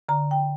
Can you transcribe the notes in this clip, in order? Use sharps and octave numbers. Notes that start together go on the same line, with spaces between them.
D3 A#5
G5